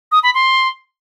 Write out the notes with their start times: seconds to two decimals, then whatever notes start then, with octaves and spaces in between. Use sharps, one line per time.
0.12 D#6
0.23 B5
0.34 C6